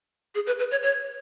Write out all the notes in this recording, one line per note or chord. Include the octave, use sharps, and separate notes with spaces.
G#4
B4
B4
C#5
C#5